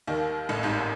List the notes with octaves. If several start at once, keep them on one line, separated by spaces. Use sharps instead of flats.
D#2 D#3
A1 A2
G#1 G#2